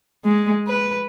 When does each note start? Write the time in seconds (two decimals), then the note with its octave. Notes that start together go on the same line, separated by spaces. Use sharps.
0.25 G#3
0.67 B4